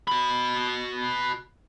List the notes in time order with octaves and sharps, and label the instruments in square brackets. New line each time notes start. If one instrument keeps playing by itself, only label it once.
[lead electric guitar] F#4 B5